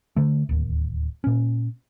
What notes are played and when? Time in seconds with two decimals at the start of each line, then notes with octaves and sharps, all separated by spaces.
0.16 D3 A3
0.49 D1 D#2
1.24 A#2 C#4